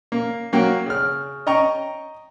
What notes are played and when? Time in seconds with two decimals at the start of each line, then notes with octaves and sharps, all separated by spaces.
0.12 A#3
0.53 F#3 A#3 F#4 G5
0.86 C#3 F6
1.47 D#5 G5 A#5 C#6